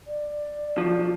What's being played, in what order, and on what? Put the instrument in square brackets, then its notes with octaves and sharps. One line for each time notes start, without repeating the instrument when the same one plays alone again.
[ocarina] D5
[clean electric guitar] B1 F3